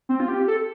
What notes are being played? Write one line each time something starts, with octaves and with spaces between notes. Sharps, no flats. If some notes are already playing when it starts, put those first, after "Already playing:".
C4
F4
G4
A4